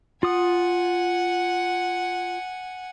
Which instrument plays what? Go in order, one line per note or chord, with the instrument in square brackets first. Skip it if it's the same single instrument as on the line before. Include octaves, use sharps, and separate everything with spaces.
[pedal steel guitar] F4 D#6 [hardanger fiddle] F#5 G#5